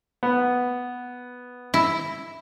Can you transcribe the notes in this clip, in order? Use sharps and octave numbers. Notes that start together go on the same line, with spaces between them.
B3
E4